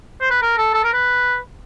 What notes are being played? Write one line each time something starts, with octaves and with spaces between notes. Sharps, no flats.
C5
B4
A#4
A4
A4
A#4
B4